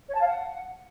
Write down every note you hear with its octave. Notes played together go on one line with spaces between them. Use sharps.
C#5
A5
F5
F#5